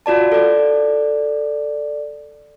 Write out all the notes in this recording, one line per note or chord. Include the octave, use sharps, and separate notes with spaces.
F4 F#4 D5 A5
A4 D5